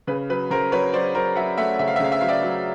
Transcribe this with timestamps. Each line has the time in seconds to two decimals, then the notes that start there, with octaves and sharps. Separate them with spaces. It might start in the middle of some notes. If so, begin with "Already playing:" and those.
0.07 C#3 B4
0.30 F#3 B4
0.50 C#3 A#4 C5
0.72 F#3 B4 C#5
0.93 F#3 C5 D5
1.14 F#3 A#4 C5
1.36 F#3 E5 F#5
1.58 A3 E5 F#5
1.79 C#3 E5
1.88 F5
1.96 E5
2.00 C#3 F5
2.12 E5
2.21 F#3 F5
2.28 D5 E5
2.42 F#3